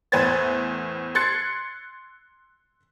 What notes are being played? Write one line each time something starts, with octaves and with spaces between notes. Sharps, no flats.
E2 A2 B4 C5 G#6 A6
C6 F#6 G#6 A6 C7 C#7